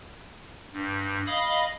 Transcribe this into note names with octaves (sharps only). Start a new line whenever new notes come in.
G2
D#5 F5 B5 D#6